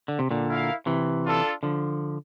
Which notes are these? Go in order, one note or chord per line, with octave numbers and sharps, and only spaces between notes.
D3
C3
A#2 D3
E4 A#4 F5
C3 E3
D4 F4 A4
D3 F3